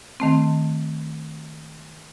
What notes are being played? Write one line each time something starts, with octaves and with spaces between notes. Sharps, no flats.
D#3 A3 C4